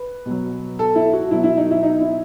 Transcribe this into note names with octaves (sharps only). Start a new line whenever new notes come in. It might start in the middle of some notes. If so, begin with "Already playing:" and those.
Already playing: B4
B2 F#3
A4
E4
F#4
B2 F#3 E4
E4
D#4
E4
D#4
E4